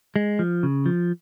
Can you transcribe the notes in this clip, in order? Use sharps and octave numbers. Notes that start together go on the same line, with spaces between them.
G#3
F3
C#3
F3